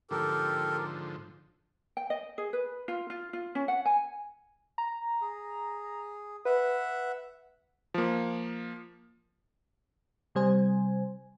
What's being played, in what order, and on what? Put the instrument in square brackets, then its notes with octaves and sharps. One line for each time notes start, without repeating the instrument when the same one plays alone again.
[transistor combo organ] G#2 D3 F3 [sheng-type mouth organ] G4 A4 A#4
[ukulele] G5
D#5
G#4
B4
F4
F4
F4
C#4
F#5
G#5
[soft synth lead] A#5
[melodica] G#4
[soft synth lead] B4 [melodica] E5 F#5
[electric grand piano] F3 A#3
[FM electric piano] C3 G3 C5 G#5